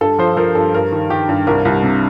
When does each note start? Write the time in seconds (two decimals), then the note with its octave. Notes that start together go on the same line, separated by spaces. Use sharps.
0.01 G2 A4
0.19 F3 C5
0.37 F3 A#4
0.55 G2 A4
0.74 G2 A#4
0.92 D#3
1.10 D#3 G4
1.29 G2
1.47 C2 A#4
1.65 C2
1.83 C3